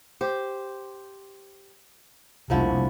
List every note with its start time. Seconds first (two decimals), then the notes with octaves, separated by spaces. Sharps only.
0.21 G4 C5
2.50 F1 C2 A#2 D3 F3 E4